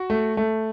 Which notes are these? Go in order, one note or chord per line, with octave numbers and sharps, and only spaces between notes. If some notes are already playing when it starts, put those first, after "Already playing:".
Already playing: F#4
A3
A3